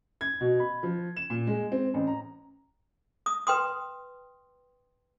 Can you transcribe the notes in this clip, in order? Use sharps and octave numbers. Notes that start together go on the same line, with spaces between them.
G#6
B2
B5
F3
E7
A#2
G#3
C4
A1
A#5
D#6
B4 G5 C6 D#6